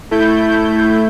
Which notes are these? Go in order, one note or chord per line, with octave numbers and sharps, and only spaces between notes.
A3 E4 G6